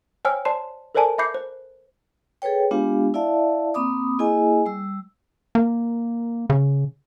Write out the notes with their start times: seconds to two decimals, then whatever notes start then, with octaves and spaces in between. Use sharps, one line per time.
0.25 C5 C#5 G5 G#5 E6 F6
0.45 C5 D5 A5 C6 C7 E7
0.95 A4 A#4 C5 D5 G#5 A5
1.18 E5 B5 D6 G6 C7 C#7
1.34 C5
2.42 G#4 A4 B4 C#5 G5
2.71 G#3 B3 D4 F4 G4 F5
3.14 E4 D5 E5 F5 A5
3.74 A#3 C4 B5 D6 D#6
4.19 A#3 E4 G#4 D#5 G#5
4.66 G3 E6
5.55 A#3
6.50 C#3